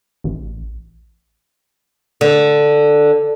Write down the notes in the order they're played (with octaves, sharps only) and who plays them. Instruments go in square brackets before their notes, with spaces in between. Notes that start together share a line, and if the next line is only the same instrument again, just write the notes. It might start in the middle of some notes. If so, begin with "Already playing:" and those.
[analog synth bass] A1
[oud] D3